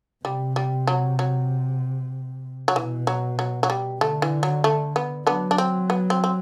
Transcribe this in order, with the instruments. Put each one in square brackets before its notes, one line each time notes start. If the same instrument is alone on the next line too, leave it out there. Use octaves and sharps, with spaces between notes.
[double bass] C3 [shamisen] G3
[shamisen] G3
F#3
F#3
F#3
[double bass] B2 [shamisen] E3
[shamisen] F#3
F#3
F#3
G3
[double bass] D3 [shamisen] A3
[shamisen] E3
F#3
A3
B3
[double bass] F#3 [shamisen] B3 D4
[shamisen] D4
C4
B3
C4
C4